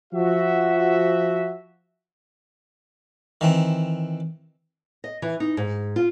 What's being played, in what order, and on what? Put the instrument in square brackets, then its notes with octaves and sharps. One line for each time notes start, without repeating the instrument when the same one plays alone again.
[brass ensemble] F3 F#4 E5
[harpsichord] D#3 E3 C4
[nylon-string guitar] D#5
E3
D#4
G#2
F4